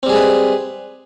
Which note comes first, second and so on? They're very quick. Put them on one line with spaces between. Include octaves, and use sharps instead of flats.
C4 G3 G#4 G#3 B4